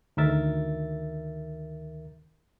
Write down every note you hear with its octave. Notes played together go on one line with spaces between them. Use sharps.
D2 D#3 A#4 E5 A6